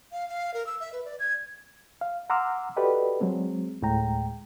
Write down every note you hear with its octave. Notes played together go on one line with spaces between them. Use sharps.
F5
F5
A#4
E6
E5
B4
D5
G#6
F5
F#5 A#5 C6 D6 E6 F6
F#4 G4 A4 B4 D5 D#5
F#3 G#3 C4
D2 A2 G#3 G5 A#5